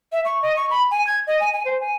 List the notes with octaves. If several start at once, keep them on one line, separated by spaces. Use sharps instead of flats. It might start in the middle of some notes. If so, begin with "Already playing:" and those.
E5
C#6
D#5
C#6
B5
G#5
G#6
D#5
G#5
G#5
C5
G#5